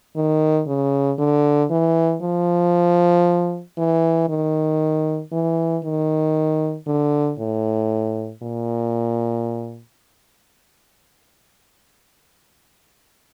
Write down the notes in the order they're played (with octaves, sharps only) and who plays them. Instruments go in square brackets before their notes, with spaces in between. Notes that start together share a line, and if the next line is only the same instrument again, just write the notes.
[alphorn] D#3
C#3
D3
E3
F3
E3
D#3
E3
D#3
D3
A2
A#2